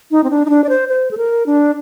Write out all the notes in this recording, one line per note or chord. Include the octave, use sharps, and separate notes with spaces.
D#4
C4
D4
D#4
D4
D5
C5
C5
A4
A#4
D4